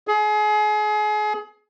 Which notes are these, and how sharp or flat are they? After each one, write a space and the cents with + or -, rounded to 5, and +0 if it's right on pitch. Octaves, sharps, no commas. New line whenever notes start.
G#4 +30